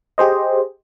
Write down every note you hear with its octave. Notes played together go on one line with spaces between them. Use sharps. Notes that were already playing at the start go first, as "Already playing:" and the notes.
G4 G#4 C5 D#5